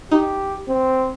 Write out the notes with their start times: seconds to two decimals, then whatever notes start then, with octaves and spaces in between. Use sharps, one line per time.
0.11 D#4 G4
0.68 C4